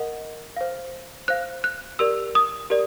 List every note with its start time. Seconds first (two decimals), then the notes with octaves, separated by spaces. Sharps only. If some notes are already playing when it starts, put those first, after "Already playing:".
Already playing: A#4 D#5 F#5
0.56 C5 F5
1.28 C5 F5 F#6
1.64 F#6
1.99 G4 A#4 D5 E6
2.35 D#6
2.70 G4 A#4 D5